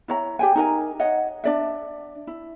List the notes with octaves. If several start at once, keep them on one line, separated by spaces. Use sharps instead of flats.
E4 C#5 A#5
G4 G5 G#5
D#4 A#4 G#5
C#5 D#5 F#5
D4 D5 E5
E4